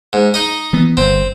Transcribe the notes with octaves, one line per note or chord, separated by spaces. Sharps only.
G#2
D#4 D#5
E3 B3
G1 C4